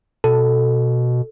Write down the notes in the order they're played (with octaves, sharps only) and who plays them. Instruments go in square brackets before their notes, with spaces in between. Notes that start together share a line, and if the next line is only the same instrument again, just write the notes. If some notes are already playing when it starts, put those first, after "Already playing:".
[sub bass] B2 [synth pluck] A4